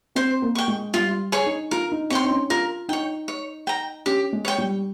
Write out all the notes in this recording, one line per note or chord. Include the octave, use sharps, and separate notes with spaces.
C4 C5
A#3
G5 C#6
G#3
G3 F4
G#4 C#5
D#4
F4 A#4
D#4
C4 C#5 G5 C6
D#4
C#4
F4 A#4
D#4 C#5 G5
C#5
G5 A#5
C#4 G4
G#3
C#5 G5
G3